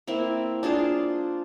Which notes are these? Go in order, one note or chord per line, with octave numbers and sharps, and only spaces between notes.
A#3 C4 E4
D4 F4 G#4 C5